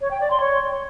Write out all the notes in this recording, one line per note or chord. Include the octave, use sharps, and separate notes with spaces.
C#5
G5
D5
C6
C#5